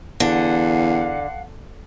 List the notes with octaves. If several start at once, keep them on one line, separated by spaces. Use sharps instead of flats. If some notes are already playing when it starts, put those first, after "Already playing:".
E2 D3 F5 F#5